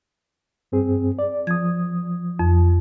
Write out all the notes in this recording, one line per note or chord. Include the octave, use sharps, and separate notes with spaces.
G2 C4 G#4
D5
F3 D#6 G#6
F2